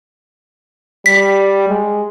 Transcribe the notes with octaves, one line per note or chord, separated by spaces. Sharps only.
G3 B6
G#3